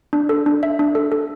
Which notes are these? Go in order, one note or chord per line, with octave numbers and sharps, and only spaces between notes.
D4
A4
D4
E5
D4
A4
A4